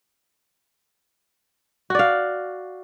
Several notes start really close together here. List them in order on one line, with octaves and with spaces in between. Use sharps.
F#4 D5 F5